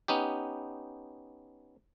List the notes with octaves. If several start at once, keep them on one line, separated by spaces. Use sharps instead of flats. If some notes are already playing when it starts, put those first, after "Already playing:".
B3 C#4 D#4 G4